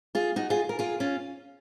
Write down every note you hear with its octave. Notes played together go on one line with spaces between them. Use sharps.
F4 G#4
D#4 F#4
F4 G#4
A#4
F4 G#4
C#4 F4